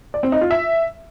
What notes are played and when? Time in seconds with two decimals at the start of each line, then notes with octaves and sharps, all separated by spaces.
0.14 D5
0.23 C4
0.32 D#4
0.41 F4
0.51 E5